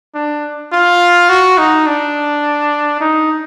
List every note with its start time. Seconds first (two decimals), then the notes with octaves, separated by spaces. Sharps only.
0.15 D4
0.72 F4
1.29 F#4
1.58 D#4
1.87 D4
3.01 D#4